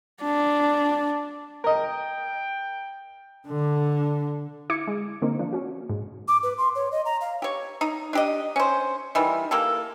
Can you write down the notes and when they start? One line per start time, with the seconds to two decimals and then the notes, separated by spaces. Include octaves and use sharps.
0.22 D4
1.64 A#4 D#5 G5
3.47 D3
4.70 E4 D6 G#6 C#7
4.87 G#3
5.22 D3 A#3 C4 D#4
5.39 F3 A#3 D4
5.53 C#4 F#4
5.90 G#2
6.28 D6
6.43 B4
6.58 C6
6.75 C#5
6.92 D#5
7.05 A#5
7.21 F5
7.42 G4 C#5
7.81 D#4
8.13 D4 G4 D#5
8.56 C#4 C5
9.15 D#3 E3 G3
9.51 A#3 G4 A4